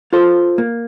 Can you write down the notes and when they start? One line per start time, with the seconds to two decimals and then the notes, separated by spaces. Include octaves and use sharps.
0.13 F4 A4 C5
0.58 A#3